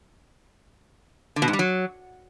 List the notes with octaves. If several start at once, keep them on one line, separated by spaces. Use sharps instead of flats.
D3
B2
G#2
G3
F#3